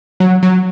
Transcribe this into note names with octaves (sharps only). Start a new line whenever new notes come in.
F#3
F#3